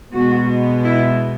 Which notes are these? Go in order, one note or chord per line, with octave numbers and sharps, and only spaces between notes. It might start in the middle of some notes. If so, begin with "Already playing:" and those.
B2 G#3 B3 F#4
E4